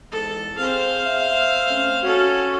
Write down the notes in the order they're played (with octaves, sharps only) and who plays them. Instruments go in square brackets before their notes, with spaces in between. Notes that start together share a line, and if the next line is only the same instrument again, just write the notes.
[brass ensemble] E2 G#2 [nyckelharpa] A4
[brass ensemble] C4 G#4 [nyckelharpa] C5 F5
[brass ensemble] E5
A3 C4 C#4
[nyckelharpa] C#4 A4 [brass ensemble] F#4